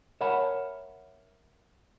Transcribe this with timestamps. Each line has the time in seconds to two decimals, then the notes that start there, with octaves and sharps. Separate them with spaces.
0.21 A#4 C#5 E5 F#5 A5 B5